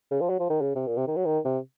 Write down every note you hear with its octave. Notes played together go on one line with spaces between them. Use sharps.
C#3
F3
F#3
F3
D#3
C#3
C3
A#2
C3
D#3
F#3
D#3
C3